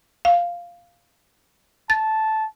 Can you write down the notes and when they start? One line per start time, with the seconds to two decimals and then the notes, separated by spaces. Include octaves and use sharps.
0.25 F5
1.90 A5 A6